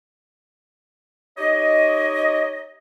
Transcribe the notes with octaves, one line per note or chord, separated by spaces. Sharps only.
D#4 G4 C#5 D#5